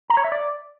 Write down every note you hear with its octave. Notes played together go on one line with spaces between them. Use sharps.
A#5
C#5
E5
D5